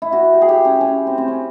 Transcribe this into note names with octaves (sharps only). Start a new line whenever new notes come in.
E4
F#4
G4
G#4
G4
C#4
C#4
C4
C4
C#4